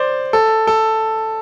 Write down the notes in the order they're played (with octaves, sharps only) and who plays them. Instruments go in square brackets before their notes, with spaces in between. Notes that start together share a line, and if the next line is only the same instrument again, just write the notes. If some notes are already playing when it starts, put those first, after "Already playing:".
Already playing: [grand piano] C5 D5
A4
A4